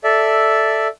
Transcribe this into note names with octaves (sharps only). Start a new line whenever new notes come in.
A4 D5 E5